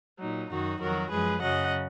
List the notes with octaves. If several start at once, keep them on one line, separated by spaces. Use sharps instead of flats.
A#2 F#3 D#4
F#2 D#3 F#3 D#4 F#4
F2 D#3 F#3 F#4 A#4
F#2 F3 G#3 G#4 B4
F#2 C#3 F#3 D#5 F#5